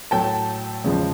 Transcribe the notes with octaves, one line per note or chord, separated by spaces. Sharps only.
A2 F#3 A3 G5 A5
E2 C#3 F3 G#3